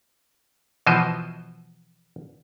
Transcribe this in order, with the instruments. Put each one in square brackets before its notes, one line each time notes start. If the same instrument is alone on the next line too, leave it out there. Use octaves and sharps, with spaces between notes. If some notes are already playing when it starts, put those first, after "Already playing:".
[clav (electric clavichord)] B2 E3 F3 C5 D#5